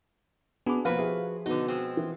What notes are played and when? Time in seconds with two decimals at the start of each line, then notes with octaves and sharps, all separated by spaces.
0.66 B3 D4 F#4 G#4 B5 D6
0.85 B2 F3 A#3 F#4 B4 F5
0.98 E4 G4 G#4
1.46 B2 D3 B3 D#4 F#4 B4
1.68 F3 G#3 C4
1.97 E3